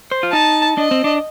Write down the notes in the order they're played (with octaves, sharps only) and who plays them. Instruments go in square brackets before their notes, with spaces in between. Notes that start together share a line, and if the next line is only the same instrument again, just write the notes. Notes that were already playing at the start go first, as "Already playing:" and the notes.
[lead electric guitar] C5
F4
[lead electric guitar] D#4 [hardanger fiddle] A5
[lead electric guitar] D4 [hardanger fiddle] D#5
[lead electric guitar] C4
D4